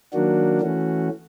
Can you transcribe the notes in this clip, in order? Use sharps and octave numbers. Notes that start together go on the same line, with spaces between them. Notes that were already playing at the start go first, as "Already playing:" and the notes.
D#3 F#3 A#3 D4 F#4
E3 A3 C#4 F#4